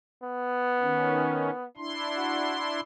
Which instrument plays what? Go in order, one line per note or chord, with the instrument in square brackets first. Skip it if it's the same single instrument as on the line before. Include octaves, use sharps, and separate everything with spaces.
[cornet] B3
[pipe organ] D#3 C#4
D4 E4 C6
[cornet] F#4